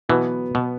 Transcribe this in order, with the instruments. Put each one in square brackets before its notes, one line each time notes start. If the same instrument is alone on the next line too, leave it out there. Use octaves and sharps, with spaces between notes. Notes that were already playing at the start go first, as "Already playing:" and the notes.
[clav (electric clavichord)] B2 E3 [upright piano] F#3 B3 F#4
[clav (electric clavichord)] B2